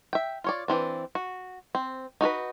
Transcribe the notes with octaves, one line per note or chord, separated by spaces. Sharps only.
E5 G5
F4 C#5 D5
E3 F3 C4 D4
F#4
C4
D#4 F#4 A4 B4